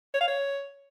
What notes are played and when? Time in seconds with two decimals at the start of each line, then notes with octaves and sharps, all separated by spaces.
0.14 C#5
0.21 F5
0.28 C#5